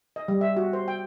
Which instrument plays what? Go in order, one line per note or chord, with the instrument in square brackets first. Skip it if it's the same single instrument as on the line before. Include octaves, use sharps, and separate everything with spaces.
[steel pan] D#5
G3
E5
F#4
C5
G5